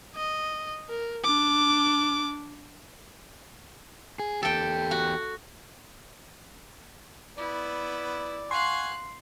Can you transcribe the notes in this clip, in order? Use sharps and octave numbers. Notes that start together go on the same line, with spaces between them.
D#5
A#4
D4 D6
G#4
E2 G4 A4 G5
F#4
B3 E4 D5
F5 F#5 G#5 C6 C#6 F#6 C7